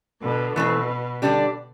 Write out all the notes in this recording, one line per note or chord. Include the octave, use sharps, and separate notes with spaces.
B2 D3
B2 E3 A3 C4
D3 G3 D4 G4